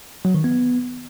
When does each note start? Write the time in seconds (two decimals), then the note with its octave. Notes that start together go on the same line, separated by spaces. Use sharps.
0.25 F#3
0.34 D#3
0.44 B3